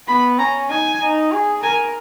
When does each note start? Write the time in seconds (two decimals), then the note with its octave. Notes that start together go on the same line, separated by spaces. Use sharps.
0.08 B3 B5
0.39 C#4 A#5
0.70 D#4 G#5
1.01 D#4
1.32 G#4
1.63 A#4 G#5